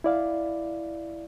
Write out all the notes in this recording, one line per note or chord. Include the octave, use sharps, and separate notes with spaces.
E4 D5 F5